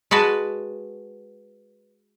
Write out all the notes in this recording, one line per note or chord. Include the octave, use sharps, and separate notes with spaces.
G#3 F#4 B4 A5